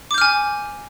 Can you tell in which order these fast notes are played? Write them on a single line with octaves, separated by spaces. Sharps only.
D6 G6 F6 G#5